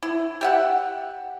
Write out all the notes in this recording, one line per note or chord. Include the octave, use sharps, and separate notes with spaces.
E4
G4 E5 F#5